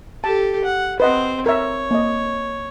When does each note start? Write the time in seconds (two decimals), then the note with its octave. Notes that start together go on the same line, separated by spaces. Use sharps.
0.24 G4 A4 A5
0.64 F#5
1.00 C4 B4 C5 D#5 F#5
1.46 A#4 C#5 E5
1.91 A#3 D#5